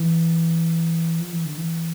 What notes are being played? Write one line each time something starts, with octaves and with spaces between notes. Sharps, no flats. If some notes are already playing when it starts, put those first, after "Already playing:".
Already playing: E3
F3
E3
D3
E3